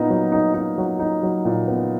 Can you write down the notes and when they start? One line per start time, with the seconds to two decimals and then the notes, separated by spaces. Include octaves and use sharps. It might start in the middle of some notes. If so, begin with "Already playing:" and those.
Already playing: A#2 B3 D#4
0.10 F#3
0.32 D#4
0.54 D#4
0.78 F#3
0.99 D#4
1.23 F#3
1.45 A#2
1.68 B3